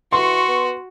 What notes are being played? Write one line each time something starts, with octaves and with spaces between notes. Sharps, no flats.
E3 F#4 C6 C#6
B3